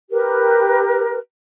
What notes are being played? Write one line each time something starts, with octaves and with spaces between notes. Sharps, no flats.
G4 A#4 B4